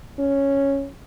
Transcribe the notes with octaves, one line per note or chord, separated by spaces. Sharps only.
C#4